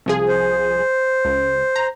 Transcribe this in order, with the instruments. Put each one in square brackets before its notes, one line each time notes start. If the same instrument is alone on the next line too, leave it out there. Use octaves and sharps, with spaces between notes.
[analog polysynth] C2 F3 G#4
[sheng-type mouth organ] C5
[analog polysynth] C#2
A#5